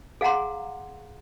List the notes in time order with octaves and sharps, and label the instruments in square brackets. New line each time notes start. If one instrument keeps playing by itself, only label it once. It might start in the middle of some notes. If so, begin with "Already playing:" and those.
[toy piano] G#4 F5 F#5 A#5 C6